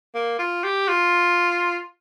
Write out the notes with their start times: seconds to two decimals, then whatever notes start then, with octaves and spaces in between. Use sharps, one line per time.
0.15 A#3
0.39 F4
0.64 G4
0.89 F4